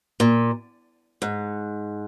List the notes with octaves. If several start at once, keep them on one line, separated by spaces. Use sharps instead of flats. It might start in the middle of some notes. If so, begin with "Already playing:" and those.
A#2
G#2